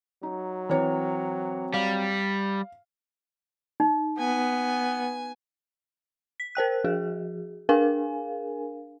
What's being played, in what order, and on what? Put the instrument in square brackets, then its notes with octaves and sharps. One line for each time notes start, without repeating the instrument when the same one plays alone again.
[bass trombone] F#3 [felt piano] D#4
[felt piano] E3 C#5 [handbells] C4 A#5
[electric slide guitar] G3 [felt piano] F5
[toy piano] D#4
[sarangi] B3 [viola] G#5
[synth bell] B6
A#4 C5 G5 F#6
F3 F#4 G#4
D4 G#4 A#4 F5 G#5